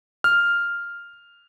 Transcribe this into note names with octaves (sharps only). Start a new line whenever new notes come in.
F6